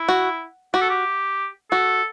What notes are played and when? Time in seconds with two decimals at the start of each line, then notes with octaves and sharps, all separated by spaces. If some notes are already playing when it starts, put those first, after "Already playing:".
Already playing: E4
0.09 F#4
0.74 F#4 G4
0.81 A4
0.89 G4
1.71 F#4 A4